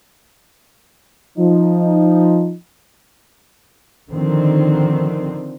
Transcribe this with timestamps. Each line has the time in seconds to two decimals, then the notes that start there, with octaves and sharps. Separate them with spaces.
1.38 F3 D#4
4.10 D3 D#3 F3 C4